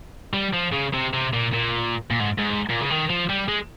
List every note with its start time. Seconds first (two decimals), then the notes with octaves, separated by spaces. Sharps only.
0.34 G3
0.54 F3
0.73 C#3
0.94 C3
1.13 C3
1.33 A#2
1.53 A#2
2.11 A#2
2.20 G#2
2.39 G#2
2.70 A#2
2.81 C#3
2.91 D#3
3.10 F3
3.29 G3
3.48 G#3